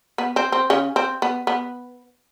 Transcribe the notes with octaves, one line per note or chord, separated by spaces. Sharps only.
B3
C4
C4
C#3 C#4
C4
B3
B3